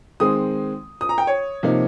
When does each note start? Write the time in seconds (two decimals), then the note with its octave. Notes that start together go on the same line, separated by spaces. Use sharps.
0.20 D#3 G#3 C4 D#6
1.01 D#6
1.09 A#5
1.18 G5
1.27 C#5
1.63 C3 F3 A#3 D#4